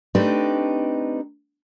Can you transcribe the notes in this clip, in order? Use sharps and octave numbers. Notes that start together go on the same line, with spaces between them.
A3 C4 D4 D#4 G4 B4